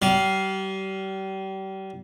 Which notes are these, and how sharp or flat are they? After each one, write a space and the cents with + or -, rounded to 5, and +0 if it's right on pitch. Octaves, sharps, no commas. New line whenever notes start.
G3 -35 F5 +0